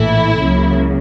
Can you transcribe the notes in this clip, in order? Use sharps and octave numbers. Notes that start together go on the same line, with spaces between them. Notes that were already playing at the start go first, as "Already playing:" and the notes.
Already playing: A#1 A2 E3 A3 E4
C#2 C#3 F#3 A#3